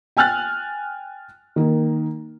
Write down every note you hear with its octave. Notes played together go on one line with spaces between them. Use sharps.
G5 G#5 F6 F#6 A6
D#3 A#3